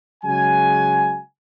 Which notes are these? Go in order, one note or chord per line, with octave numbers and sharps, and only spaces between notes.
C#3 F#3 G#3 F#4 G#5